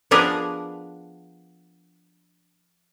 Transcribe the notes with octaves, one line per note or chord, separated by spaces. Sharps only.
F3 B3 D4 G#4 A#4 B4